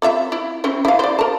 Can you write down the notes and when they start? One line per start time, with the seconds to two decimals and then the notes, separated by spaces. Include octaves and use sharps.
0.02 C4 F4 E5
0.32 E4
0.64 C4 C#4 E4
0.85 E4 F5
0.99 C5 D5
1.19 A#4 A5